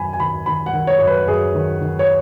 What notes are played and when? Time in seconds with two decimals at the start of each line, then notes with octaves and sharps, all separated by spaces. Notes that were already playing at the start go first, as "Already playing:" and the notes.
Already playing: F#2 D#3 G#5 B5
0.13 G#5
0.20 D#3 B5
0.46 D#3 B5
0.66 F#5
0.73 D#3
0.87 C#5
0.99 F#2 C#5
1.07 B4
1.28 F#2 G#4
1.55 D#3
1.81 D#3
1.99 C#5